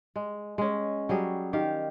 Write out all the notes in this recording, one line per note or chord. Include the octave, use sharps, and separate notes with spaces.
G#3
G#3 C#4
F#3 G3 G#4
D#3 G4 F5